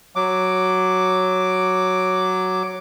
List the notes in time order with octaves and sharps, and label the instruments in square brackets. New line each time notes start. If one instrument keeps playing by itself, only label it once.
[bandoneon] F#3 D6